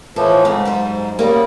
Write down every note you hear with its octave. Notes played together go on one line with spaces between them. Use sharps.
A2 E3 F3 A4
G#2 C#3 C4
F#2 G3 C5
C#3 G3 A#3 F#4